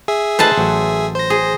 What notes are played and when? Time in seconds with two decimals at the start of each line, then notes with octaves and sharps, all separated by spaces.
0.08 G#4 E5
0.39 A3 D#4 B4 C5 F#5 A5
0.58 A1 F#3
1.15 C5 A#6
1.30 G#4